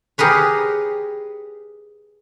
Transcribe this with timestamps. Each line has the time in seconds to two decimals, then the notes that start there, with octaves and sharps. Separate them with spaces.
0.18 G4 G#4 A#4 B4 C#5